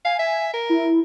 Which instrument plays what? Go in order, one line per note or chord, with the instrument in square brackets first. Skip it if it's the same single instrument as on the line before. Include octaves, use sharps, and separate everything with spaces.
[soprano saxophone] F5 [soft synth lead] G#5
[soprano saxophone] E5
A#4
[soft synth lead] E4